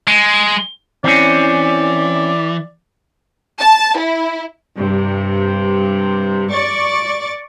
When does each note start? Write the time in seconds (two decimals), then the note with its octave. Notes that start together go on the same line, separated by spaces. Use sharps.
0.08 G#3
1.04 E3 C4 C#4 D5
3.60 A5
3.97 E4
4.75 G2 C3
6.51 D5 C#6 A6